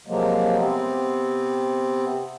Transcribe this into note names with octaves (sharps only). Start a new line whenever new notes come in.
C3 F3 F#3 G#3 A#3
C3 B3 C4